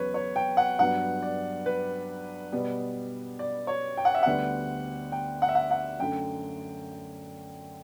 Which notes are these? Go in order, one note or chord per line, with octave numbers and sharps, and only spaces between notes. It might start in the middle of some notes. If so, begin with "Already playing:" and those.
Already playing: E2 C#3 F#3 B3 B4 C#5
C#5
G5
F#5
G2 F#3 B3 F#5
D5
B4
B2 G3 B3
D5
C#5
G5
F#5
E5
D2 D3 G3 B3 F#5
G5
F#5
E5
F#5
F#5
F#2 D3 A3 G5